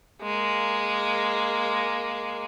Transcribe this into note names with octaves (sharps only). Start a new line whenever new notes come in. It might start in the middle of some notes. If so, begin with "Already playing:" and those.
G#3 A#3